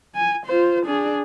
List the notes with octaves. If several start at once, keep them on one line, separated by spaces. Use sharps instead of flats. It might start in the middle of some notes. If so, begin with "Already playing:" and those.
G#5
F4 C5
D4 G#4